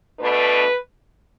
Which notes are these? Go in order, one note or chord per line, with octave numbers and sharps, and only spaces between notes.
B2 A3 D4 B4